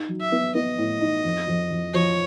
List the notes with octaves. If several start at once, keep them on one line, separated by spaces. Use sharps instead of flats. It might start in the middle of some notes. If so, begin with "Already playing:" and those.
Already playing: D#4
F#3
E5
B3
B3 D#5
A2
D#4
F2
F2
F2
F3 C#5